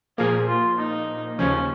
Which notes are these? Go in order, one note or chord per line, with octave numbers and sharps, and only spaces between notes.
A#2 F3 A#3 G#4
F4
D#4
D#2 C#3 F3 C#4